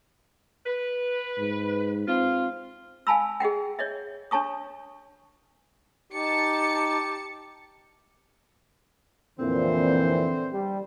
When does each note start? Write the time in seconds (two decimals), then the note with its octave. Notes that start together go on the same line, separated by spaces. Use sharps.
0.66 B4
1.38 G#2
2.08 C4 F4
3.07 F5 G#5 A5 B5 E6
3.40 G#4 D#5 F#5 G5
3.79 C#5 D#5 E5
4.31 D4 C#5 A5 C#6 D#6
6.13 D#4 G4 A5 C#7
9.40 F2 A#2 D3 E3 C4 C5
10.53 G3